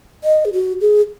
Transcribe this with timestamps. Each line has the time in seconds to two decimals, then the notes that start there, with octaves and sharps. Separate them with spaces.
0.24 D#5
0.45 G#4
0.53 F#4
0.81 G#4